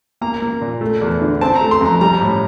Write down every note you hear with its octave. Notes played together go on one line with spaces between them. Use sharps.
A#3 A#5
A#3
A#2
A3
E2
D3
C4 A5
A#5
A3
C6
F2 A#5
G3 A#5
A2